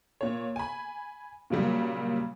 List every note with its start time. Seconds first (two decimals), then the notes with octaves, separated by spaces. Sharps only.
0.21 A#2 C#5
0.56 G#5 B5
1.50 A#2 C#3 F#3 G3 A#3